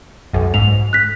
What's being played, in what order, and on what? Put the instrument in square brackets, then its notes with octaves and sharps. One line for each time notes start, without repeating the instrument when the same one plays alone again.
[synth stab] B1 F#2
[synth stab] G#2 [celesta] F7
[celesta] F#6 B6